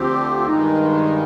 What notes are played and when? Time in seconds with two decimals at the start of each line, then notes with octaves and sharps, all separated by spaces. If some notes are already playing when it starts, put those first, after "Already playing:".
Already playing: D2 D3 F3 C4 F4 G4
0.35 F4
0.47 G2 D#3 G#3 D#4